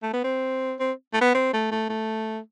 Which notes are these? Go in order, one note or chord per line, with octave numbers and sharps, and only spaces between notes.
A3
B3
C4
C4
A3
B3
C4
A3
A3
A3